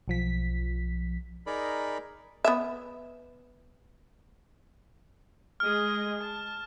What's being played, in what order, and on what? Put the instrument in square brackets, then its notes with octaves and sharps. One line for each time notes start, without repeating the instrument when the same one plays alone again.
[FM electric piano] B1 F3 B6
[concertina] D#4 G#4 A#4 D5 B5
[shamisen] B3 E5
[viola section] G#3 G#4 D#5 [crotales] F6
[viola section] A5